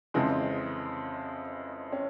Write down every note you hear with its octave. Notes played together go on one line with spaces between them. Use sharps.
F2 C#3 E3 G#3 C4
C#4